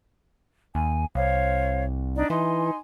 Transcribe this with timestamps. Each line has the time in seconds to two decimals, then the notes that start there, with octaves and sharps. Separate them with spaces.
0.75 D#2 G#5
1.15 C2 C5 C#5 F5
2.16 D4 D#4 D5
2.30 E3 D#4 G#5 C6